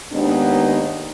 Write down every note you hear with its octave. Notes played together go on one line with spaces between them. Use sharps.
D#2 G#3 B3 D4 D#4